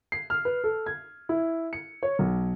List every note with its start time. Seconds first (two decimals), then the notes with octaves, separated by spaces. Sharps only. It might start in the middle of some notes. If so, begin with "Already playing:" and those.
0.12 C7
0.30 F6
0.45 B4
0.64 A4
0.86 G#6
1.29 E4
1.73 C#7
2.03 C#5
2.19 B1